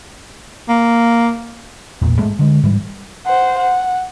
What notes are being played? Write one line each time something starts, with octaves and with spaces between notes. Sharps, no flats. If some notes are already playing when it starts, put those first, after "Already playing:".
A#3
E1 A#1 E2 A#2
G#2 G#3 A3
D3 G#3
G#2 E3 G3
C5 F#5
F#5